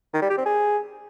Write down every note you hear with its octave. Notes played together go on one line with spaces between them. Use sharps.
D#3
G3
G4
C4
G#4